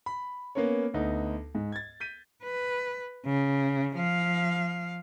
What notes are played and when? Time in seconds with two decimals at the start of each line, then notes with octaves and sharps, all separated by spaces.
0.06 B5
0.55 A#3 B3 C#4 A#4 C#5
0.94 D2 B3 D#4
1.55 G#2
1.72 G#6 A6
2.00 G6 B6 D#7
2.44 B4
3.26 C#3
3.96 F3 F5